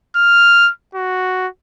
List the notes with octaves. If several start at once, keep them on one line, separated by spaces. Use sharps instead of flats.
F6
F#4